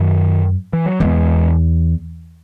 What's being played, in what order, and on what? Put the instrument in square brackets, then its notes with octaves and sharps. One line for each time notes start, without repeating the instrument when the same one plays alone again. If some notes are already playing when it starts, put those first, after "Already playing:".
Already playing: [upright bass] F#2 [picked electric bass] D#3 F#3
[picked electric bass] E3
F#3
[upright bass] E2 [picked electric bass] E3 G#3